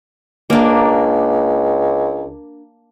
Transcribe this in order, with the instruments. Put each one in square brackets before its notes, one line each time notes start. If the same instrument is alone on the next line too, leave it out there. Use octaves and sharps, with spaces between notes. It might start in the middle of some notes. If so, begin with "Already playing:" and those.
[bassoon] C#2 [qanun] A#3 D4